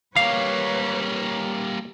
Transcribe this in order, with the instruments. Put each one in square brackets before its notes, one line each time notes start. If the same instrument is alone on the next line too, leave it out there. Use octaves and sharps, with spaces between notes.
[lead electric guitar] G3 A#3 [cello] B4 C#5 [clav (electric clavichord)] F5